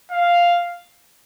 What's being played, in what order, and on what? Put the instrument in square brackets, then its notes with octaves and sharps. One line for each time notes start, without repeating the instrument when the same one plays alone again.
[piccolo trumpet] F5